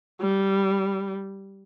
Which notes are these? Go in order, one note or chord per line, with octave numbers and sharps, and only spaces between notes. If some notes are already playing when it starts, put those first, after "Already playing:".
G3